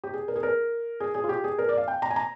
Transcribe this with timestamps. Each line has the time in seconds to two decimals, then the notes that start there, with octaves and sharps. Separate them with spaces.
0.04 G4
0.14 G#4
0.28 A#4
0.36 G#4
0.43 A#4
1.00 G#4
1.15 G#4
1.24 F4
1.29 G4
1.44 G#4
1.58 A#4
1.69 D5
1.78 F5
1.88 G5
2.02 A#5
2.11 G#5
2.16 A#5